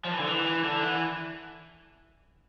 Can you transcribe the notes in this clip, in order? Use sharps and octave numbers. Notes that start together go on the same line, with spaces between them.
F3
E3
D3
E3
D3
E3